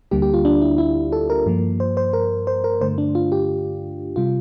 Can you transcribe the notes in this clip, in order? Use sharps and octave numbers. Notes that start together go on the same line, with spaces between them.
D2 D3 G3 A#3 G4
G4
F4
D4
E4
E4
A4
A#4
G2 F3 A#3
C5
C5
A#4
C5
A#4
G2 D3 A3 C5
D4
F4
G4
C3 G3 F4